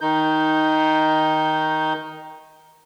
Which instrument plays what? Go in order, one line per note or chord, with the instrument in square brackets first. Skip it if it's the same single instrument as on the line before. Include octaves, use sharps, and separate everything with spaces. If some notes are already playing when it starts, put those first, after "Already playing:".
[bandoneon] D#3 D#4 G6